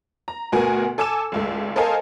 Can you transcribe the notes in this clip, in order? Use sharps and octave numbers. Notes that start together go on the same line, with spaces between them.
A#5
D2 B2 F#4 A#4 G#5
A4 G#5 D6 E6 E7
G#1 C#2 A3
A4 A#4 C5 D#5 F5 G#5